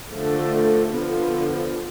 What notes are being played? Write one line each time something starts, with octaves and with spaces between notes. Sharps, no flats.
D3 F3 A3
D3 F3 B3 F4